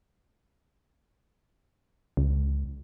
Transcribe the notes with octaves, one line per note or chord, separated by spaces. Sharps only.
C#2